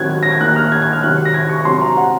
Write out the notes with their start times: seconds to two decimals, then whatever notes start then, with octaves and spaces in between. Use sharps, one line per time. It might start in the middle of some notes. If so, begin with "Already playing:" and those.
Already playing: D#3 F#3 C4 F#6 G#6
0.23 A#6
0.32 G#6
0.40 D#3 A#3 F#6
0.56 F6
0.72 G#6
0.82 G#6
0.93 F6
1.03 C3 D#3 F#3 C4 F#6
1.25 A#6
1.34 G#6
1.49 C#6
1.65 C3 F#3 C4 C6
1.81 A#5
1.97 F#5